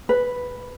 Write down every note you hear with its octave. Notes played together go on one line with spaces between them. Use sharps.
B4